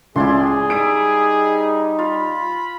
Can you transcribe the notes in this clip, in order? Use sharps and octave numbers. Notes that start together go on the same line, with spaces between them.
C#2 A2 E4 G#4 D5 C6
G3 D#4 E5 D#6 D7
F4 B5